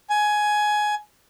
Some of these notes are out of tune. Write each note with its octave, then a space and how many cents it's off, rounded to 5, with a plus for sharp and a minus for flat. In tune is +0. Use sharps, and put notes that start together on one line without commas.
G#5 +15